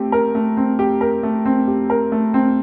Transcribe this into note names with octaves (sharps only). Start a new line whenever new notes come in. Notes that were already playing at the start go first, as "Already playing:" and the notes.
Already playing: A3 C4 G4
A#4
A3
C4
G4
A#4
A3
C4
G4
A#4
A3
C4